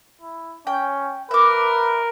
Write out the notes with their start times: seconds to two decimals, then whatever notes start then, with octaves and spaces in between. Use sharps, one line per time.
0.21 E4
0.67 C#4 G5
1.31 A#4 B4 E5 D6